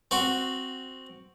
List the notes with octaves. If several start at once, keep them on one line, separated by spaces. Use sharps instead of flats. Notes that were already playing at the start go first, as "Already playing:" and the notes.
C4 F#4